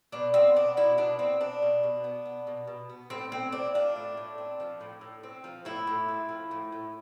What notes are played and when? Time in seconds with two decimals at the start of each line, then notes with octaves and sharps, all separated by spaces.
0.12 B2 D4
0.34 B3 C4
0.56 B3 D4
0.77 B2 E4
0.97 B2 D4
1.19 B3 C4
1.40 B3 D4
1.62 B2
1.83 B2
2.04 B3
2.25 B3
2.47 B2
2.67 B2
2.89 B3
3.10 A2 C4
3.32 A2 C4
3.52 C4 D4
3.75 F3 D4
3.96 A2
4.17 A2
4.38 C4
4.60 F3
4.81 A2
5.01 A2
5.23 C4
5.44 F3
5.65 A2 E4
5.87 A2
6.09 C4
6.29 F3
6.51 A2
6.72 A2